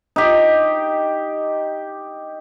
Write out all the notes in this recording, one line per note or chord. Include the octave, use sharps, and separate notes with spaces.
D#4 G4